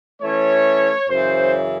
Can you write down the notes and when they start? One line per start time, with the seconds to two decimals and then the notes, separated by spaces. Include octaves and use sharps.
0.21 E3 A3 C#4 C#5
1.09 F#2 C#3 E3 C5